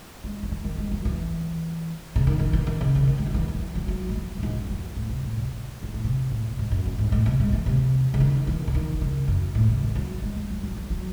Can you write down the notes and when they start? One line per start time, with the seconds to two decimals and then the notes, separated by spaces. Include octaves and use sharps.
0.24 G#3
0.43 F#3
0.52 E3
0.64 D#3
0.78 G#3
0.91 F#3
1.05 E3
2.16 C#3
2.27 D#3
2.40 D#3
2.53 E3
2.67 D#3
2.81 C#3
2.95 C#3
3.07 D#3
3.18 G#3
3.26 F#3
3.34 E3
3.48 F#3
3.75 F#3
3.88 F#3
4.09 G#3
4.15 F#3
4.37 A2
4.43 G#2
4.56 F#2
4.69 F#2
4.97 A2
5.10 C3
5.24 A2
5.37 C3
5.83 G#2
5.94 A2
6.04 C3
6.31 A2
6.59 G#2
6.71 F#2
6.85 F#2
6.99 G#2
7.12 A2
7.26 C3
7.40 G#3
7.53 E3
7.66 C3
8.14 C#3
8.20 D#3
8.47 E3
8.68 C#3
8.75 D#3
9.01 C#3
9.28 F#2
9.55 A2
9.68 C#3
9.82 D#3
9.95 F#3
10.22 G#3
10.36 G#3
10.50 F#3
10.63 F#3
10.77 E3
10.90 F#3